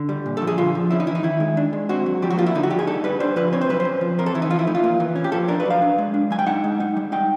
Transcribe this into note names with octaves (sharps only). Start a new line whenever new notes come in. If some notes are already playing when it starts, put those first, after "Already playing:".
Already playing: D3
G3
A#2
A4
F3
G#4
D3 F4
F3
C#4 E4
D#4
E3 E4
D#4
D#3 E4
G#3
D4
G#3
C4 F#4
F#3
F3 G4
F#4
A#3 F4
E4
D3 D#4
F#4
G3 G4
G#4
D#4 A4
G3 B4
D4 C5
F3 B4
C4 C#5
C5
F#3 B4
C5
C#4
F3
C4 A#4
A4
E3 E4
D#4
F3 F4
E4
A3 D#4
F4
A#3
E3
C#4
G4
F3 A4
D4 A#4
B4
F#3 F5
D4
G#3
D4
F#3 G#5
G5
D#4 F#5
G#3
D#4
G3
D#4 G5